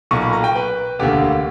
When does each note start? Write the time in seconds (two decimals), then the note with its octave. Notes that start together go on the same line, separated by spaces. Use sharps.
0.11 B1 A#2 A#3 C#6
0.22 B5
0.33 A#5
0.44 G5
0.56 B4
0.99 E1 D2 D3 A#3 G4